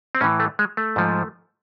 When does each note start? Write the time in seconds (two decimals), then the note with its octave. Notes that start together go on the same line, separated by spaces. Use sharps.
0.15 C4
0.21 A2 E3 C#4
0.40 A3
0.59 G#3
0.77 A3
0.96 G#2 F3